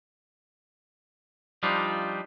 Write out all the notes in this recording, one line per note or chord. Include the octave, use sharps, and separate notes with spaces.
F3 G3 D4 D#4 F4